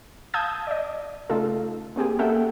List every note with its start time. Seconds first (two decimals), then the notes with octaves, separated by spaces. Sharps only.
0.34 F5 A5 D#6 E6 G6 G#6
0.67 D5 D#5
1.30 C#3 A3 D#4 F4 A4
1.96 A#3 C4 G4 G#4
2.19 A#3 C#4 A4 E5 F#5 G5